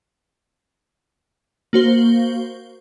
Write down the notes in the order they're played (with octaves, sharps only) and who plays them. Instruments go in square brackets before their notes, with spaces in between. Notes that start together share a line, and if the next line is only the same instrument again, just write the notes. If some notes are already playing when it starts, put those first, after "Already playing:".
[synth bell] A#3 F#4 C5 G7